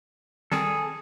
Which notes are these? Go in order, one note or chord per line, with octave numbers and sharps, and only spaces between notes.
D#3 G3 C4 G#4 A4